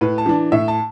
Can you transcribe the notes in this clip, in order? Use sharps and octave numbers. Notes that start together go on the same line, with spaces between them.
A2 B4
A5
E3 D4
A2 E5
A5